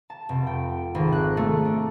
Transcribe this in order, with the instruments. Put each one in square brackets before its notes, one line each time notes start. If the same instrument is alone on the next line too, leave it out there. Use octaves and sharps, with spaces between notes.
[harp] A5
F1
G5
G#1
F#6
A3
D4